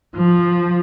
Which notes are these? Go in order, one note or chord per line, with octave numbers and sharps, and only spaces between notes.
F3